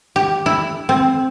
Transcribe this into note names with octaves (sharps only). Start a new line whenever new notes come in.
G4
E4
C4